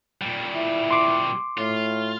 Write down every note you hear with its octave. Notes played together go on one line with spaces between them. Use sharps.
A#2 G3
E4
C6 D6
A2 F4